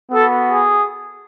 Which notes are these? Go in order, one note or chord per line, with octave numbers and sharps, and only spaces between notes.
B3 F#4 A4
G#4